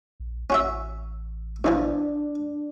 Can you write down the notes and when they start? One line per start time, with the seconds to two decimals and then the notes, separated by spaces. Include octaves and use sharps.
0.20 A#1
0.50 A1 C#4 F#4 E5
1.64 B2 E3 F3 D4 D5